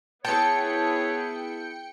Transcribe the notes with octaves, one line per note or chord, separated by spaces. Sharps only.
B3 E4 G#4 C#5 G5 A5 C#7